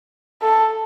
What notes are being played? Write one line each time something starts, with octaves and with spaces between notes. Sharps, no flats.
A4